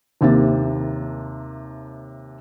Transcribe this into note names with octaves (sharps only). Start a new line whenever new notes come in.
D#2 C3 A#3 E5 A6